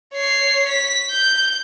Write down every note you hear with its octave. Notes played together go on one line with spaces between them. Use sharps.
C#5 C7
B6
G6